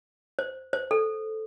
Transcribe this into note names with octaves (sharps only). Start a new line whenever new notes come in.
C5
C5
A4